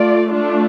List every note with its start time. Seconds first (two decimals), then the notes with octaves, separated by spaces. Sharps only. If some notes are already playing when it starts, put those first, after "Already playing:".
Already playing: A3 F4 D5
0.30 A3 D4 F4